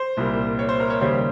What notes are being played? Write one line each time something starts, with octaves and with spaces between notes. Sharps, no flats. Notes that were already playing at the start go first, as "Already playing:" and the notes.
Already playing: C5
C2 A#2 G3 A#3
C#5
C5
A#4
C#5
D#2 C#3 G3 A#3 C#4 C5